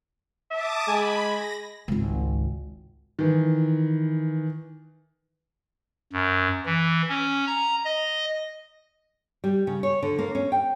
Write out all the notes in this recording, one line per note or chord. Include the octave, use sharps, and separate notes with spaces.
E5 A5 D6 D#6
G#3 G#5 B5
A#6
G#1 C#2
D#3 E3
F#2
E3
C#4
A#5
D#5
G3
C#3
C#5
D3
A#3
C#4
G5